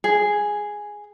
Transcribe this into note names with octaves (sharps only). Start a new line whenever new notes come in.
G#4